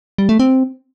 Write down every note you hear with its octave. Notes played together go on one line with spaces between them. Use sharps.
G3
A3
C4